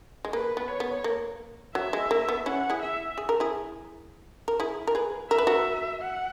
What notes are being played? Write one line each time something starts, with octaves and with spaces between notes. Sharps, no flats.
G#3
A#3 B4
B3
C#5
B3
A#3
F#3 E5
G#3
A#3
B3
C#4 E4 F#5
E4 G#4
E5
G#4
A#4
E4 G#4
A#4
E4 G#4
A#4
G#4 B4
A#4 E5
B4
F#4 A#4
F#5